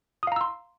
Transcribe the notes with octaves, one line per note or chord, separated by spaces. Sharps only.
F5 A#5 C6 D#6 E6